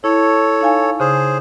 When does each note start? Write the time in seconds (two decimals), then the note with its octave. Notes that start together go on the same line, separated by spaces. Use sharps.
0.04 E4 A4 C#5
0.61 D#4 F5 G#5
1.00 C#3 G#4 C5